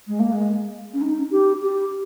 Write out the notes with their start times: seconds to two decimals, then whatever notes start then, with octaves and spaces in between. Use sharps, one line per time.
0.07 G#3
0.19 A#3
0.32 G#3
0.94 C#4
1.01 D#4
1.31 G4
1.62 G4